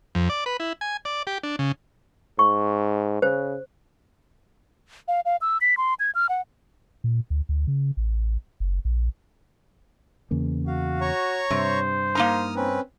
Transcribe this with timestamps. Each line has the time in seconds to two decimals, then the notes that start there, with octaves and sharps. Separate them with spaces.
0.15 F2
0.30 D5
0.46 B4
0.60 E4
0.81 G#5
1.05 D5
1.27 G4
1.43 D4
1.59 C#3
2.39 G#2 C#6
3.22 C#3 C5
5.08 F5
5.25 F5
5.41 E6
5.61 B6
5.77 C6
6.00 G#6
6.15 F6
6.29 F#5
7.04 A#2
7.30 D2
7.49 D2
7.67 C#3
7.97 A1
8.60 F#1
8.85 A#1
10.31 E2 C#3 A#3
10.67 F#4 F5
11.01 C#5 A#5 C#6
11.51 G2 C3 C5
12.15 A#3 D#4 A#5 D#6 F6
12.56 C4 C#4 B4